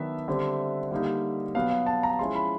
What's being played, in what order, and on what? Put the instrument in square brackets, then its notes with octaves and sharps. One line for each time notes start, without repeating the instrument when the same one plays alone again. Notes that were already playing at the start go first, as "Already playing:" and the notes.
Already playing: [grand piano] D#3 F#3 B3 D4 E5
D3 G3 C4
D3 G3 A#3 D#4
B2 F#3 B3 F5
F5
A5
A#5
F3 G#3 C#4 E4 C6
B5